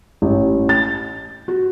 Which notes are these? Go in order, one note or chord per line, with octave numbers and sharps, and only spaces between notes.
A1
A6
F#4